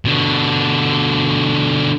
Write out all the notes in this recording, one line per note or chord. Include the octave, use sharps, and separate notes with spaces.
B2 D3